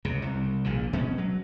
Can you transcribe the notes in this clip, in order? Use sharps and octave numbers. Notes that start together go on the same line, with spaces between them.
C#2 C3
C2
A#1 A#2 D3
B2 G#3 A#3 C#4
F#3